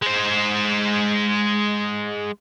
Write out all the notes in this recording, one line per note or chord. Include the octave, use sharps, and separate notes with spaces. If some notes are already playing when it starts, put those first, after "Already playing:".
G#3 C5